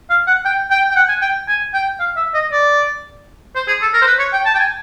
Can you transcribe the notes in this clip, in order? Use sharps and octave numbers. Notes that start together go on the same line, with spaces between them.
F5
F#5
G5
G5
G5
F#5
G#5
G5
G#5
G5
F5
E5
D#5
D5
C5
G#4
A4
A#4
C5
B4
C#5
G5
A5
G5
G#5